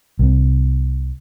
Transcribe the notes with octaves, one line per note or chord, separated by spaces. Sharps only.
C2 C3